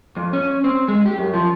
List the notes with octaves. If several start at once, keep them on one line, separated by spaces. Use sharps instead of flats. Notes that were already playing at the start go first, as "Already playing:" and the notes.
F2
C#4
C4
G#3
G4
F#2
F3